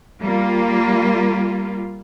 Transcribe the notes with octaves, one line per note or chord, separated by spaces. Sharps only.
G3 A#3 F4